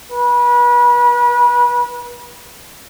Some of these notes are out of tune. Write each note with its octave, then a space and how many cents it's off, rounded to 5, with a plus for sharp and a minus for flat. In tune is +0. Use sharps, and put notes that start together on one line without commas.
B4 -35